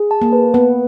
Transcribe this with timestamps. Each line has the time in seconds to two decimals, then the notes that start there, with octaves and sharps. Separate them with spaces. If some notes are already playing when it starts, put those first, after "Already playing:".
Already playing: G#4
0.11 A5
0.22 A#3
0.33 B4
0.54 B3 B4